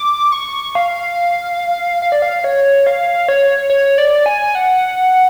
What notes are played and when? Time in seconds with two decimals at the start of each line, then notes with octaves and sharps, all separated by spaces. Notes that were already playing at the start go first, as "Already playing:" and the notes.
Already playing: D6
0.32 C#6
0.75 F5
2.02 F5
2.12 D5
2.22 F5
2.44 C#5
2.86 F5
3.28 C#5
3.70 C#5
3.98 D5
4.26 G#5
4.55 F#5